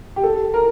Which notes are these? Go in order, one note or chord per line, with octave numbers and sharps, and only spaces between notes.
G4
A4
A#4